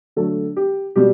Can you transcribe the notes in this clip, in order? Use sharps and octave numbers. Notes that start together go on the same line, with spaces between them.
D3 F#3 A3 A4
G4
B2 G3 G4